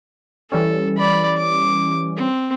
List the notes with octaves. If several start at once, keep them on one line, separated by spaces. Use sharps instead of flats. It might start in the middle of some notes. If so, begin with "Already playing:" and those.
E3 G3 C#4 A4
D5 B5
D6
C4